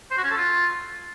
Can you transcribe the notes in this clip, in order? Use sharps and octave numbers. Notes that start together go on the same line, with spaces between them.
C5
F#4
C#4
A4
F4